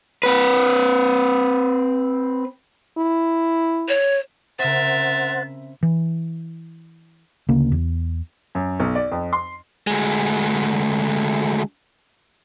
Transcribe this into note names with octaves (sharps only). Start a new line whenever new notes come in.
C4 B4
E4
C#5
C#3 C4 A#4 C5 E5 F#5 A6
E3
D2 C#3 A#3
E2
F#2
B1
D5
F2
C6
D2 G#3